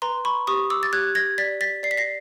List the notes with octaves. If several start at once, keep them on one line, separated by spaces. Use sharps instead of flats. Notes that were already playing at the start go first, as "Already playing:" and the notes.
B4 A#5 C6
B5 C#6
G4 C#6 D#6
D6 E6
A6
G4 F#6 G#6
G#6 A#6
D5 A6 B6
A6 B6
D5 C7
B6
A#6 C7